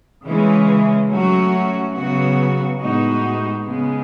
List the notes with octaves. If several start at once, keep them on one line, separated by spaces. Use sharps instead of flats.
C#3 E3 G#3 C#4
F#3 A3 C#4 F#4
C#3 F#3 B3 F#4
A2 G#3 B3 D#4 F#4
C#3 G#3 B3